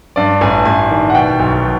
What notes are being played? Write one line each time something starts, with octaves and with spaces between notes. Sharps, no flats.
G2 D5
A1 G#5
A1 G#5
D#3
F#5
B2 G5
B1
B2